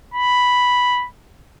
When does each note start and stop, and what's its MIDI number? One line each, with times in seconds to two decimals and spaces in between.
0.14 1.06 83